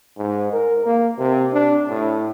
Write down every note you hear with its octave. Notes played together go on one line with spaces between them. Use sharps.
G#2
A#4
A#3
C3
D4
A2